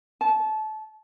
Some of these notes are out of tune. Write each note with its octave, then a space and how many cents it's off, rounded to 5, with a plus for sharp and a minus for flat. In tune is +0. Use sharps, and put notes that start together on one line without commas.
A5 -25